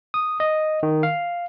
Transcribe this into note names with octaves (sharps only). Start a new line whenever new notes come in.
D#6
D#5
D#3
F5